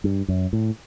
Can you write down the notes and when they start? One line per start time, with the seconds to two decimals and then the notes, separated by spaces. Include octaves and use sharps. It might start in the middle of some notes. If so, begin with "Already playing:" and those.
0.04 G2
0.28 F#2
0.53 A2